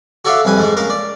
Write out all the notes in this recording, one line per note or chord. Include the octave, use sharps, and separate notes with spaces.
F#4 A4 C#5 D5 E5 F5
C2 F2 B4 G#5
G#2 F3 G#3
C#3 A#3 A#4
D5